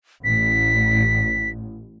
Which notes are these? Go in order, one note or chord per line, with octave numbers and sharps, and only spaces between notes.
A1 B6